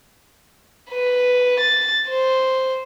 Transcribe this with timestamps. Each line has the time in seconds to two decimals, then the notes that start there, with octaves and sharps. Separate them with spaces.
0.91 B4
1.59 A6
2.09 C5